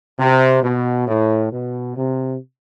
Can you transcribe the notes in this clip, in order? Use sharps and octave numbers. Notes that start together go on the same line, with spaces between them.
C3
B2
A2
B2
C3